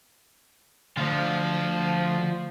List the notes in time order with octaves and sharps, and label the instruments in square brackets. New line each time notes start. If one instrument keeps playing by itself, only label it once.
[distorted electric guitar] D2 [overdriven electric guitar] F3 F4